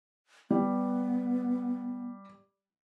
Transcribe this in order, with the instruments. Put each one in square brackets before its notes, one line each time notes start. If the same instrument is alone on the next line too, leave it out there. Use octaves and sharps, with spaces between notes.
[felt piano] G3 [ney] B3